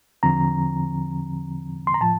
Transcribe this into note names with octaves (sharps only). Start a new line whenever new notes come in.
E2 D3 F3 C4 A#5
C6
A#5
A2 F3 A5